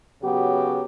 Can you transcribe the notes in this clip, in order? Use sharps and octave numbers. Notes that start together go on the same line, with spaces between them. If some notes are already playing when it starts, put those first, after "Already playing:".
C#3 F#3 B3 F#4 G4